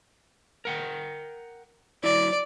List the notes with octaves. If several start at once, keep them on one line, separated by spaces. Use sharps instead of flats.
A#4 F#5 G5
F#3 E4 D5